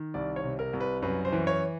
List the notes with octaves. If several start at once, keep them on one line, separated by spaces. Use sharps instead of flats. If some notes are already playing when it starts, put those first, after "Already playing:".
Already playing: D#3
C2 D5
C#5
C3
A#4
C2
B4
F#2 B4
C5
E3
C#5